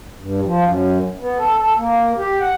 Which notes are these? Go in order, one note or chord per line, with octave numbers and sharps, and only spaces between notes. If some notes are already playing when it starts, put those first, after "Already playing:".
G2
F3
F#2
B3
A4
A4
A#3
G4
F#5